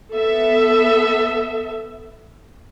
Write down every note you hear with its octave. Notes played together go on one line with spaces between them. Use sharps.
B3 A4 E5